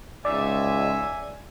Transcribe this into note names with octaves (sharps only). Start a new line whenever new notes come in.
C#2 D#4 D5 E5 G#5